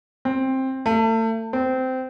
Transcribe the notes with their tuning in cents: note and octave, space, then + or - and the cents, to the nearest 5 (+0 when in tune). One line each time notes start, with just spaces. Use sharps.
C4 +15
A3 +35
C4 -15